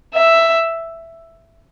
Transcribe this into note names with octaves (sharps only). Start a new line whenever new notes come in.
E5